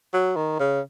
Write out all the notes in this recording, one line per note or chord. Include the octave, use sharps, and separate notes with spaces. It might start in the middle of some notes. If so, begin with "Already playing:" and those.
F#3
D#3
C#3